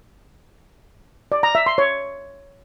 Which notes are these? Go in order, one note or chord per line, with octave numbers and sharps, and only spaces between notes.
D5
A#5
E5
C6
C#5